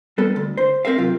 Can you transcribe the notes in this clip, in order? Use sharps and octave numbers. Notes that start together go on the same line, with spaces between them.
G3 B3 A4
D2
C5
C4 A#4 E5 F5
C3 F#3 F4 G4